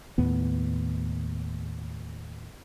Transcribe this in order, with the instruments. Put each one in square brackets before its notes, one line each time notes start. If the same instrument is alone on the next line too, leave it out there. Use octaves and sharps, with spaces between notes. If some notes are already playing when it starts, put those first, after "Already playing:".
[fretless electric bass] D#2 A2 B3